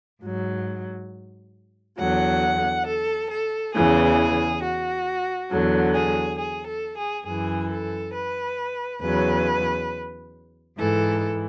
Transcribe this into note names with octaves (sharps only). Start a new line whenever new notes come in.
G#2 F#3
E2 D3 F#3 F#5
A4
A4
E2 C#3 E3 G#4
F#4
E2 D3 F#3
G#4
G#4
A4
G#4
F#2 E3 G#4
A4
B4
E2 C#3 F#3 B4
G#2 E3 A4